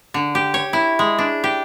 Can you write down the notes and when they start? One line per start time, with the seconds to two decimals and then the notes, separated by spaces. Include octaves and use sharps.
0.14 D3
0.35 G4
0.54 C#5
0.73 E4
0.99 G#3
1.19 D4
1.44 G4